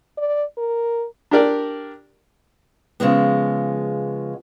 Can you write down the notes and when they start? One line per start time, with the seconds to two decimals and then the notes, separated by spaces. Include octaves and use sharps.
0.18 D5
0.58 A#4
1.31 D4 G4 A#4 D5
3.00 C#3 F3 G#3 B3